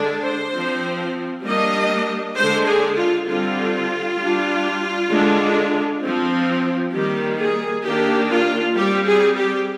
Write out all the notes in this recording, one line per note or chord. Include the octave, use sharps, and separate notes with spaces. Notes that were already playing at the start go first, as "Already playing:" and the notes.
Already playing: D3 G#3 D4
C5
F3 C4
G3 A#3 D4 D#5
D3 G#3 D4 C5
G#4
F4
D3 G3 C4 F4
G3 D4
D3 G#3 D4
F3 C4
D#3 G3 A#3 G4
G#4
D#3 A#3 D4 G4
F4
G3 C4 G4
G#4
G4